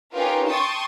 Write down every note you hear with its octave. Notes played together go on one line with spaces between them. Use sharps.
C#4 D#4 F4 G4 A#4 B4
G5 A5 C6 C#6 D#6 A6